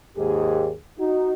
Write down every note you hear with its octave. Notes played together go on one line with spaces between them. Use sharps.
D#2 G#2 G4 G#4
D#4 F#4